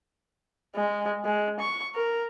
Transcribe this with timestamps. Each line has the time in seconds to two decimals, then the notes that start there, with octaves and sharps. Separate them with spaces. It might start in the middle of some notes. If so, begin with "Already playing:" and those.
0.76 G#3
1.25 G#3
1.60 C#6
1.95 A#4